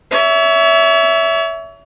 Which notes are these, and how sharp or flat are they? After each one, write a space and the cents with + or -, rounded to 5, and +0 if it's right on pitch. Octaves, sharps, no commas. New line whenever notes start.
C#5 +35 E5 +0